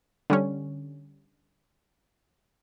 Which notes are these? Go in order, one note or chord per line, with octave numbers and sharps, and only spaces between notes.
D3 G3 C#4